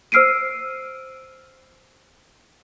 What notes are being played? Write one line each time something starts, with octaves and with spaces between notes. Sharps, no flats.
C5 E6 F6 C7 D7 D#7